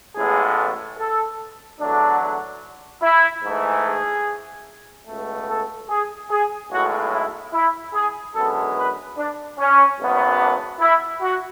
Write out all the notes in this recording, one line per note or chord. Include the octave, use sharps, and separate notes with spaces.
A1 A2 G#3 B3 G#4
A4
E2 D3 F#3 A3 D4
E4
G#2 E3 A3
G#4
C#2 B2 A3
A4
G#4
G#4
B1 A2 G#3 F#4
E4
E4
G#4
F#2 D3 G#3 B3 A4
B4
D4
C#4
G#1 F#2 C#3 F#3 B3
D4
E4
F#4